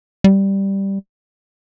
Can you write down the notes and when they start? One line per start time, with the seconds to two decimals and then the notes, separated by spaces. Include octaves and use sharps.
0.24 G3